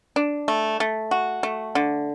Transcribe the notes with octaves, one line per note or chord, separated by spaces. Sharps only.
D4
A3
A3
F#4
A3
D3